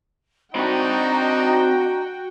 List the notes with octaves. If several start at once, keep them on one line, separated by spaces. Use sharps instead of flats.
C4 D4 D#4 F#4 D#5 G5 A#5 B5